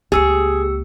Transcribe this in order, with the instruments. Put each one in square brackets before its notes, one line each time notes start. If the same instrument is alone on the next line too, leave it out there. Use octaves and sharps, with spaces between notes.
[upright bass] C#2 A#3 [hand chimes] G4 E6 C#7 [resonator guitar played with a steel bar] G#4